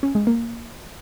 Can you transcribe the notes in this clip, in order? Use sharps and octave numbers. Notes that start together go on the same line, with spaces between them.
C#4
G#3
A#3